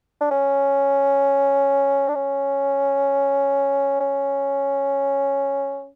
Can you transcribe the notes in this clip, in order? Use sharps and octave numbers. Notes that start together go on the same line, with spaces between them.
D4
C#4
D4
C#4
C#4